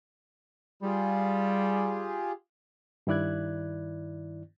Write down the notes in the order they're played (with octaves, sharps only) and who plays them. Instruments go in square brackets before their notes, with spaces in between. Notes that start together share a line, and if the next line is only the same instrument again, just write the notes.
[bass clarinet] G3 [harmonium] F4 G4 G#4
[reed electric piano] G2 D#3 E4 D5 F#6 G#6